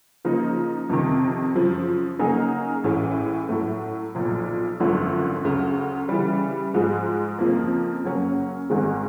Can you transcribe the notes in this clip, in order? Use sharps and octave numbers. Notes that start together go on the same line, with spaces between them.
C#3 F3 A#3 D#4
F2 C3 D#3
F#2 C#3 F3
C#3 F#3 A#3 D#4 G#4
A1 A2 E3 G#3 C#4
A2 F#3 A3
B1 A#2 F3
G#1 F#2 D3 F3 A3
D2 C#3 F#3
C#3 E3 G3
G#2 F3 G#3
F2 C#3 F3 A#3
F#2 C#3 F#3 A#3 C#4
G#1 G#2 D#3 G#3 C4